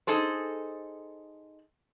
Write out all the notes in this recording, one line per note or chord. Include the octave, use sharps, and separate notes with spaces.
D#4 G#4 A4 C5